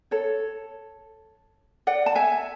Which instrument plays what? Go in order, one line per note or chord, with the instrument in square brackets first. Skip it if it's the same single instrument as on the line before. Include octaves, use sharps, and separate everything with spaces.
[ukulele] A4 C#5
D5 F#5
A5
E5 G#5